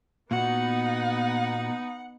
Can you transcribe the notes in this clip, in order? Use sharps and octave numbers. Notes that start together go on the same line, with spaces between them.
A#2 B3 D#4 F#4 F#5